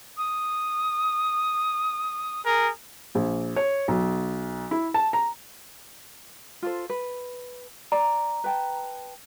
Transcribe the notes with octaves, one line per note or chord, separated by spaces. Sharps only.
D#6
G#4 A#4
A#1
C#5
B1
E4
A5
A#5
F4 A4 C5
B4
D5 A#5
B4 G5 A5